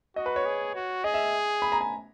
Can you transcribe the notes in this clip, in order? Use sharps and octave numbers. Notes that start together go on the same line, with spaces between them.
F#4 D#5
B4
C#5
G#4
F#4
G#4 D#5
E5
B5
A#5
G#5